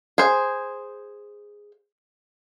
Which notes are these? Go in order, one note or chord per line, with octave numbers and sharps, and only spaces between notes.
G#4 C5